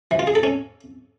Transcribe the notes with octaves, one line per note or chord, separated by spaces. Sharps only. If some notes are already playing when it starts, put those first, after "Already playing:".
E3
F4
G#4
A4
C#4